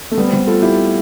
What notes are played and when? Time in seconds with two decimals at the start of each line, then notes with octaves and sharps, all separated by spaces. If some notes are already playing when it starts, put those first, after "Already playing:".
0.12 A3
0.17 G3 B3
0.27 C4
0.33 G3 B3
0.47 F4 A4
0.62 E4 G4